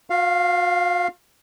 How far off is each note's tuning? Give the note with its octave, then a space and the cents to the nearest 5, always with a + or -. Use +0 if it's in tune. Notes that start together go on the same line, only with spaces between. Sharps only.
F#4 -45 F5 +0